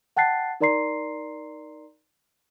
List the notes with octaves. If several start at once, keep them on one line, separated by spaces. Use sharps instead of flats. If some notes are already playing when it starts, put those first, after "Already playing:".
F#5 G5 A5 F#6 A6 C7
D#4 A#4 D5 A#5 C6 C7